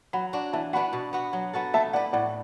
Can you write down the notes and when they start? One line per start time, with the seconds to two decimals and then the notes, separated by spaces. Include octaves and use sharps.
0.13 F#3 F#5 B5
0.33 D4 F#4
0.53 E3 E5 A5
0.73 B3 D4 F#4 F#5 B5
0.93 B2
1.13 B3 F#4
1.33 F#3
1.53 B3 F#4 A4
1.74 A3 E5 A5
1.93 E4 B4 D5 F#5
2.13 A2 D5 F#5